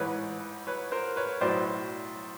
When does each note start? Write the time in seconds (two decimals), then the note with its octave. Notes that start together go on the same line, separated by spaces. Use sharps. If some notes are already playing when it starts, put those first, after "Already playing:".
Already playing: A1 G#2 E3 B4 C#5
0.67 B4 C#5
0.92 A#4 C5
1.16 B4 C#5
1.41 B1 A2 F#3 C5 D5